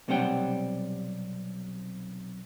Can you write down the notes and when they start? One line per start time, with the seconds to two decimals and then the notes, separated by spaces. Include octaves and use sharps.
0.08 B1 C3 G3 D4 F#5 G5